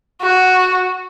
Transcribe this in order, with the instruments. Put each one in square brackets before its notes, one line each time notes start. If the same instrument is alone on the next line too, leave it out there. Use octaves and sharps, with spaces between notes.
[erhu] F#4